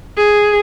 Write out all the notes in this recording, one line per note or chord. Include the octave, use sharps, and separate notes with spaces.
G#4